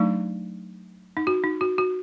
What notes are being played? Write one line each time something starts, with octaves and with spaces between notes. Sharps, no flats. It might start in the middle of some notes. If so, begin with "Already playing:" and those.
Already playing: F#3 A3 D4 D#4
D#4
F#4
D#4
F#4
F#4